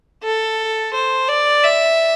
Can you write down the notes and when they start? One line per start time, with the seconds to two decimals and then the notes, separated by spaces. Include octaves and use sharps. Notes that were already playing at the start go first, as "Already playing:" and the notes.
0.23 A4
0.93 C5
1.28 D5
1.64 E5